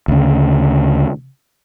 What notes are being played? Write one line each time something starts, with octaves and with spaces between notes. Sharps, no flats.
D2 C#3